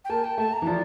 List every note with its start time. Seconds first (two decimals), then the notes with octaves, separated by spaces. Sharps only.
0.05 G5
0.09 A#3 A5
0.24 G5
0.38 A3 A5
0.52 A#5
0.62 E3
0.66 F3 D5